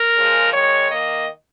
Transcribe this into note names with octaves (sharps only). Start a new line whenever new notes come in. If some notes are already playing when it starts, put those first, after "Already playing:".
Already playing: A#4
C#3 F3 G#3
D#3 G#3 C#5
D#3 A#3 D#5